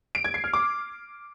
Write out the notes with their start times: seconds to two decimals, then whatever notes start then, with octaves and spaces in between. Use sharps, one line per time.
0.15 D7
0.24 G#6
0.34 C7
0.44 F6
0.53 D6